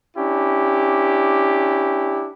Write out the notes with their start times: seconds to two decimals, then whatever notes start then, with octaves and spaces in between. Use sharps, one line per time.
0.17 C#4 D4 E4 G4